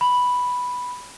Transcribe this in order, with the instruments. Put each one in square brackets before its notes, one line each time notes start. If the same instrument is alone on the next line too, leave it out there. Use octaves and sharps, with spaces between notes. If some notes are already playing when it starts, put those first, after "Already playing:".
[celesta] B5